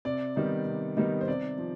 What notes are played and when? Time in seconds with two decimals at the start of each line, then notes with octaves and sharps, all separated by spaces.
0.05 C3 D5
0.36 D#3 G3 B3 D#4
0.67 C3
0.97 D#3 G3 B3 D#4
1.21 C5
1.28 C3 D5
1.58 F3